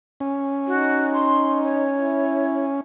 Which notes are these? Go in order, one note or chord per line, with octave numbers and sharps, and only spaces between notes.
C#4
D#4 F#4
C6
C#5
E4